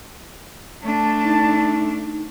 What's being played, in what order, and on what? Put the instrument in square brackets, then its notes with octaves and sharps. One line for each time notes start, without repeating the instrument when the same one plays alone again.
[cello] A3 D4 [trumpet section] A5
[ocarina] D#4